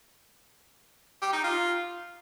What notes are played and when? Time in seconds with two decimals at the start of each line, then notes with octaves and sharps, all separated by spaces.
1.22 G4
1.33 D#4
1.44 F4